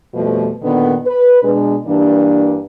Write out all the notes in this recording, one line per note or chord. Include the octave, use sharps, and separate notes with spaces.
F2 B2 F3 G3 A3
A#2 D3 D#3 B3
B4
B2 G#3 D4
G2 E3 G3 A#3 D4